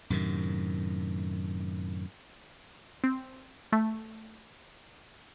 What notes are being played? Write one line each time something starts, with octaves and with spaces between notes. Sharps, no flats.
F#2 A2 C3 D#3
C4
A3